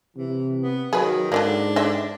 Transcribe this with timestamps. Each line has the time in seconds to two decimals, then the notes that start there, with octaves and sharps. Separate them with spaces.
0.17 C3 E3
0.62 B3
0.93 D#3 F#3 G#4 B4
1.32 G#2 D3 F#3 A#3 D4
1.76 D3 D#5 E5